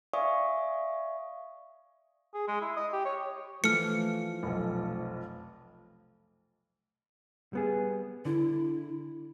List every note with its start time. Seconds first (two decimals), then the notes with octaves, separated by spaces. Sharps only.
0.13 D5 E5 F5 G#5 C#6 D#6
2.34 G#4
2.48 G#3
2.61 E4
2.77 D#5
2.93 G4
3.05 C#5
3.64 E3 F3 A3 A4 F6 C#7
4.43 F1 B1
7.53 G3 B3 G#4
8.25 D3 E4